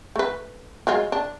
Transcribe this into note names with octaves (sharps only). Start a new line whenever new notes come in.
A3 B4
F#3 G#3 F4
D4